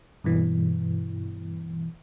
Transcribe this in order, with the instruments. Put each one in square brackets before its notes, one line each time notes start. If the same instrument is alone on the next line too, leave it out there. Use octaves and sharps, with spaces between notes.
[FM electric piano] G2 B2 E3